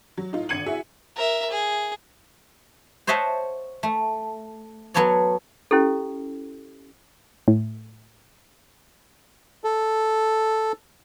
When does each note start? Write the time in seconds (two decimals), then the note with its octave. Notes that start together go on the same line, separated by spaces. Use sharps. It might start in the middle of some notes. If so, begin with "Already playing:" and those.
0.17 F#3
0.32 A2 D#4 F4
0.49 G#1 D3 G#6 C#7 D#7 F#7
0.66 E4 F#4 G#4 E5
1.16 A#4 E5
1.50 G#4
3.07 C5 C#5 D#5 E5 F#5 A5
3.83 A3
4.94 F#3 B3 A4 C#5 D5
5.71 C#4 E4 G4 A4
7.48 A2
9.64 A4